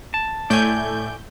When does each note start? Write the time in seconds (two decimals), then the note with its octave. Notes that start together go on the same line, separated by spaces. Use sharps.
0.14 A5
0.50 A2 A3 D5 G#5 G6